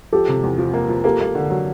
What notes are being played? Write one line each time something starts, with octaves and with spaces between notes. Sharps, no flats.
F3 G4 A4
C3
E2
F3
A#3
F3
A#3 G4 A4
A#3
D3
F#3